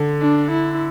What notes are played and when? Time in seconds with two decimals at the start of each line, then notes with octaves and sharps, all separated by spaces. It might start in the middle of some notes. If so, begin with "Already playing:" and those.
Already playing: D3
0.22 D4
0.51 E4